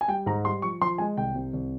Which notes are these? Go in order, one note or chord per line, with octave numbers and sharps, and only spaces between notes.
G#5
G3 G5
G#2 A#5
G3 C6
F3 C#6
F3 C6
G#3 G#5
C2 G5
C3
C2